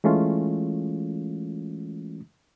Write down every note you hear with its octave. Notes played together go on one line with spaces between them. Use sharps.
E3 G#3 A3 C#4 F4